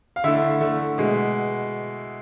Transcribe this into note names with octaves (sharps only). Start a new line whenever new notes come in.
F5
D3 A3 E4 E5
D3 A3
B2 G#3